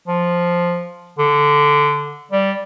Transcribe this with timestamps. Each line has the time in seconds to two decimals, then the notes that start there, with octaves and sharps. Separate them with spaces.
0.08 F3
1.18 D3
2.31 G3